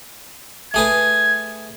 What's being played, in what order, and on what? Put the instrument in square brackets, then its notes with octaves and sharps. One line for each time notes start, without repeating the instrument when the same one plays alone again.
[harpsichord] A3 G#4 B4 [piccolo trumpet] G#6